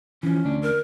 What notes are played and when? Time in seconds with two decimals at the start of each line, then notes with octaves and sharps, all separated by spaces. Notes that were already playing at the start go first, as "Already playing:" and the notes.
0.23 E3 F3 C#4
0.45 D2 D4
0.62 A#4